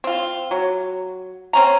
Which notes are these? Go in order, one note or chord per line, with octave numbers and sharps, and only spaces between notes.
C4 F4
F#3
C4 C#4 A#5